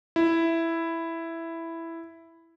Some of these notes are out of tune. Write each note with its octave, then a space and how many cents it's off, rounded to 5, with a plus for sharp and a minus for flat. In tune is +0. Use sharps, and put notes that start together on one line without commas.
E4 +5